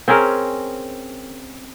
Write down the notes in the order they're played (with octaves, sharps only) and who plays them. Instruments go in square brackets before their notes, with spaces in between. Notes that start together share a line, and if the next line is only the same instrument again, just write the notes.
[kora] C4 C#4 G#4 A#4